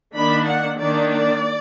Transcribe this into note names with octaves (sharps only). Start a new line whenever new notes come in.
D#3 A#3 D4 B5
F#5
D#3 A#3 D4 D5
D5